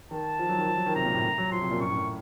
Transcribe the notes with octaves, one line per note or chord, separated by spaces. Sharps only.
D#3 A5
F3
F#3
D#3
F3
F#3
D#3
C3 A#5
A#2
A2
F#3
F3 C6
C3
A#2
F#2 C#6
A2
F#2